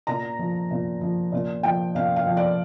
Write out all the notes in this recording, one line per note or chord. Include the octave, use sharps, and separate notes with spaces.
A#2 A#5
F3
A#2
F3
A#2
F3 G5
A#2 F5
F5
F3
D5